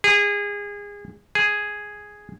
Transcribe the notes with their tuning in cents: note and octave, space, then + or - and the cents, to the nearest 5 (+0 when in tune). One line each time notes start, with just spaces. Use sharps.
G#4 -25
G#4 +0